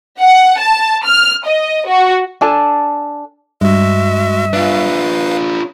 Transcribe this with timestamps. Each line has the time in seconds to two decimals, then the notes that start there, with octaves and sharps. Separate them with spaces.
0.20 F#5
0.59 A5
1.05 F6
1.46 D#5
1.87 F#4
2.41 D4 A4 G#5 A5
3.61 G2 G#3 F#4 E5
4.53 D4 F4 B4 F5